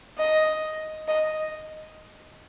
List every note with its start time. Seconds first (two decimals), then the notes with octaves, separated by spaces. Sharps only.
0.18 D#5
1.08 D#5